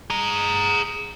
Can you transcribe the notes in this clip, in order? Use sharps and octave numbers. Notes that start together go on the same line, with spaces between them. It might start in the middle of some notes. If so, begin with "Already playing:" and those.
G#4 A#5